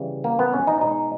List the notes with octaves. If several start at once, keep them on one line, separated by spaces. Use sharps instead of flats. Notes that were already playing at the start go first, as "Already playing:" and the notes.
Already playing: C#3 E3 G3
A#3
B3
C#4
D#4
B2 G#3 D#4